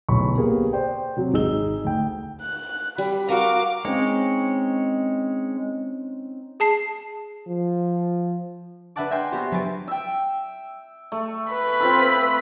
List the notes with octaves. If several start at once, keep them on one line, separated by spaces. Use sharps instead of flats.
D1 B1 B5 C#6
A#3 B3 G4 G#4 A#4
C5 D5 G5
C3 F#3
G#1 D#4 G#4 D#5 E6 G7
D2 G5
F#6
G3 B5
F#4 A#4 F5 A#5 D6
G#3 C4 C#4 D#4 C#5
G#4 A5 C7
F3
D4 B4 E5 F#5 A5 D6
A#4 E5 G5 G#5 C6 G6
B3 F#4 G4 C5
F#3 B4 G#5 A6 D7
E5 G5
A3
B4 B5
C4 F4 A4